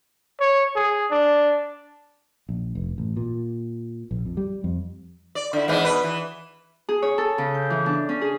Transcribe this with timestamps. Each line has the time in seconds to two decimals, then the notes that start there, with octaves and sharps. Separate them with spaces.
0.40 C#5
0.76 G#4
1.11 D4
2.49 A#1
2.75 F1
2.98 A1
3.17 A#2
4.11 A#1
4.25 F2
4.37 G3
4.64 F2
5.35 D5
5.53 D3 E4
5.68 G#2 B2 E3
5.84 B2 B4
6.04 E3
6.89 G#4
7.02 C#5
7.18 A4
7.38 C#3
7.54 G6
7.70 E3
7.86 D4
8.09 C#4
8.21 G#4